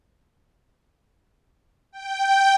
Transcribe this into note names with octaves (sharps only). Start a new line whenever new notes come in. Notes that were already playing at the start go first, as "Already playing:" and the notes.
G5